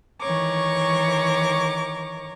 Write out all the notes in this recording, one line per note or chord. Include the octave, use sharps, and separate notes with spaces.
D#3 E3 C#5 A#5 C#6 D6